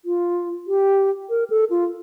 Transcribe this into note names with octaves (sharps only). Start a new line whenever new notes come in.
F4
G4
A#4
A4
F4